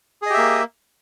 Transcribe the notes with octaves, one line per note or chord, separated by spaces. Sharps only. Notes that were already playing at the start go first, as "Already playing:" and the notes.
A#3 G4 G#4 D#5 E5